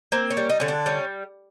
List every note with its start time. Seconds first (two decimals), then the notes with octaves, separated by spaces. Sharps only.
0.12 A#3 C4
0.30 C#4
0.37 G3
0.49 D#4
0.60 D3 C#4
0.68 D4
0.86 G3 C#4